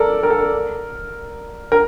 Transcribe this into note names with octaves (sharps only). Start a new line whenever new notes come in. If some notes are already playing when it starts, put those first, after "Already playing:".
Already playing: A4 A#4 D5
A#4
A4
A#4
A#4